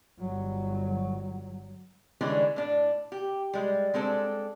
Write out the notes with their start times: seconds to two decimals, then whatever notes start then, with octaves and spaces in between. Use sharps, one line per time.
0.20 G1 F#3
2.21 D3 E3 G3 G#3 C#4 D4
2.56 A2 D4
3.12 G4
3.54 G3 G#3
3.94 G#3 C4 D4 A4